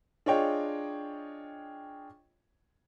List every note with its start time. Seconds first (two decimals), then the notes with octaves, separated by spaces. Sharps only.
0.26 D4 F4 G#4 C#5 D#5 G5